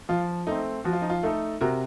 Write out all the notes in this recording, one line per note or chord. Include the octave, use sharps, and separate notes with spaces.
F3 F4
A3 C4 D#4
F3 F#4
F4
D#4
F4
A3 D#4 A4
C3 F#4 A#4